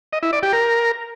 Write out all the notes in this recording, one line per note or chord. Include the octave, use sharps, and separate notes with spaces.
D#5
E4
D5
G4
A#4